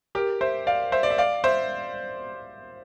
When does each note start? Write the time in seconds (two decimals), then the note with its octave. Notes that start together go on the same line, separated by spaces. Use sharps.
0.15 G4 A#4
0.41 C5 E5
0.67 D5 F5
0.92 C5 E5
1.03 D5
1.10 E5
1.18 D5 F5
1.44 C5 E5